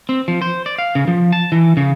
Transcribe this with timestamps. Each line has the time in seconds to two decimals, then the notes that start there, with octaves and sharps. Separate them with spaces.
0.09 C4
0.28 F3
0.42 C5
0.66 D5
0.78 F5
0.95 C#3
1.08 F3
1.32 A5
1.52 E3
1.77 C#3